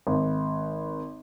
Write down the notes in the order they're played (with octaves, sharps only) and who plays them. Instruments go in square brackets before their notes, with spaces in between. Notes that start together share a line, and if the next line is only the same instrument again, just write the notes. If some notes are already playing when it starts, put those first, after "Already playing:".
[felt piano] G#1